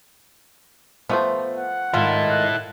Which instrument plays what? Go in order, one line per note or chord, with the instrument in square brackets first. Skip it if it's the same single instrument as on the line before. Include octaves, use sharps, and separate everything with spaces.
[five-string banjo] F3 A3 C5 [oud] B3
[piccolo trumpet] F#5
[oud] G#2 D#3 [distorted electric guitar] E4 A4 [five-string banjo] F4
[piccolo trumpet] F#6